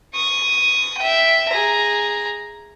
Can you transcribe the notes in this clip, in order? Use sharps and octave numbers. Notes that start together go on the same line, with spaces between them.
C#6 D#6
E5 G5
G#4 A#5